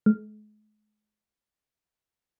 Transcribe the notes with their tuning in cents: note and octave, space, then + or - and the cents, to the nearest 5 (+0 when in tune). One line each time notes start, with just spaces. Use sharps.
G#3 +40